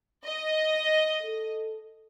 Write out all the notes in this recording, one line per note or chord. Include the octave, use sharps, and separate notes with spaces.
D#5
A4